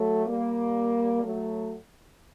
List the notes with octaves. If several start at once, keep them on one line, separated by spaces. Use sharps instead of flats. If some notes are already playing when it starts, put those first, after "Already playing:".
Already playing: F#3 A3
G3 A#3
F#3 A3